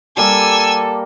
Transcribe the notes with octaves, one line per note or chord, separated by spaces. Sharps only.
G3 A#3 A4 G#5 D6 E6